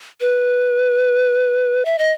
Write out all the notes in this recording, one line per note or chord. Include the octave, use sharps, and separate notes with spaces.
B4
E5
D#5